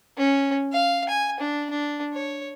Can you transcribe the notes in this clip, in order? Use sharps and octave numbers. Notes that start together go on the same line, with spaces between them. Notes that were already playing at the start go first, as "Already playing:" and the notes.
C#4
F5
G#5
D4
D4
C#5